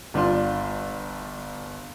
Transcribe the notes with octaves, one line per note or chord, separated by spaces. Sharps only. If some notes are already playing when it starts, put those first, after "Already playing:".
G1 D4 F4 C6